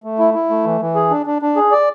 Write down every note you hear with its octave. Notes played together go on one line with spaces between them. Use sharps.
A3
E4
E4
A3
E3
E3
G#4
D4
D4
D4
G#4
D5